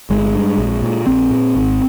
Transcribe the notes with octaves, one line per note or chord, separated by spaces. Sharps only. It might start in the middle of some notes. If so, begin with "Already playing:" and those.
G1 G#3
G2
A#1
A#2
A#1 C4
A#2
G#1